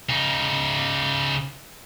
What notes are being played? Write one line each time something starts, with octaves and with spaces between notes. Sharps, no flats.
C#3 D#4